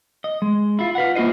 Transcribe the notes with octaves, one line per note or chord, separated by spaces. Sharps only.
D#5
G#3
E4 F4
F4 B4 F5 F#5
A#3 E4 F4 C5 D#5